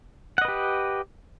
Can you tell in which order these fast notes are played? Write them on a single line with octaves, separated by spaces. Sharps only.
F#5 D#5 B4 G4